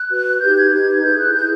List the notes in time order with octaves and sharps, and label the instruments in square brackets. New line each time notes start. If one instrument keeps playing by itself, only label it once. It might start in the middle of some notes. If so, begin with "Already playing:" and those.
Already playing: [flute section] F#6
F#4 B4
D#4 G4 B4 G6
G#6
D#4 G4 B4 G#6
E4 G#4 B4 G6
F#6
E4 G#4 B4 G6